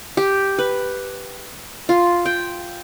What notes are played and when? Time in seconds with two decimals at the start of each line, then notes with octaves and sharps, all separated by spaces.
0.17 G4
0.58 B4
1.89 F4
2.26 G5